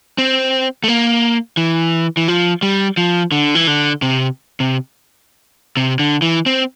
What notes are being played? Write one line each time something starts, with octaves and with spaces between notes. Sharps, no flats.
C4
A3
A#3
E3
E3
F3
G3
F3
D3
E3
D3
C3
C3
C3
D3
E3
C4